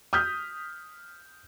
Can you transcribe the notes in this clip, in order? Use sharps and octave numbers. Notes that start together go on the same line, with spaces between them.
D#6 F6 G6 B6